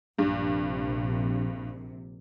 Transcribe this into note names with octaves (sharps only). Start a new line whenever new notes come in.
A#1 G2 C3